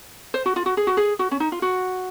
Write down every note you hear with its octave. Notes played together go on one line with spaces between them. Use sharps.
C5
F#4
F4
F#4
G#4
F#4
G#4
F#4
C#4
D#4
F4
F#4